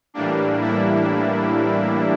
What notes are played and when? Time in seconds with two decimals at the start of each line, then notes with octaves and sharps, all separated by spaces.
0.14 A2 E3 G3 A#3 D4
0.61 E4